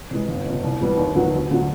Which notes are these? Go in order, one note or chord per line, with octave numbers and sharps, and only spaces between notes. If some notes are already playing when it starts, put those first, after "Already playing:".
C3 E3 G#3
G1
F2 C3
C2
C3 E3 G3 B3
D#2
D3 F#3 B3 D#4
D2
D3 F#3